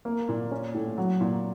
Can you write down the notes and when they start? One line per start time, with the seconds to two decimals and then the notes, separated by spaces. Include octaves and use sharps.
0.05 A#3
0.29 A#2
0.51 C#4
0.74 A2
0.98 F#3
1.21 A#2